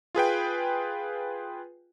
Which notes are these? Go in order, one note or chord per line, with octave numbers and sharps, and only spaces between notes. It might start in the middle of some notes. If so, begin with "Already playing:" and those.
F4 G#4 B4 G5